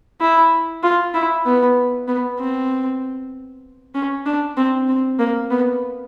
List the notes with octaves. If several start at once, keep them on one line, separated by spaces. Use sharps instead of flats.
E4
F4
E4
B3
B3
C4
C#4
D4
C4
C4
A#3
B3